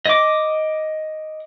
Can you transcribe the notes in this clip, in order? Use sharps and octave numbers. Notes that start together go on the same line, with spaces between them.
D#5 D6